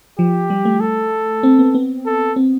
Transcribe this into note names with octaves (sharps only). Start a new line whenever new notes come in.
F3 G4
G3
A3
A4
C4
B3
B3
A4
C4